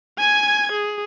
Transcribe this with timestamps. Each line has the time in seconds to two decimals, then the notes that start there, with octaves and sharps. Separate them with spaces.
0.18 G#5 G#6
0.72 G#4